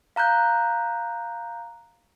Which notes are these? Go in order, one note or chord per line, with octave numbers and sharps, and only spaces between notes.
F5 A#5 F#6 G6